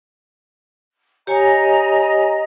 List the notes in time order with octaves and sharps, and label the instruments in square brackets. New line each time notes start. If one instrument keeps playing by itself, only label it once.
[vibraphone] G4 C#5 G#5 [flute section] D#5 A#5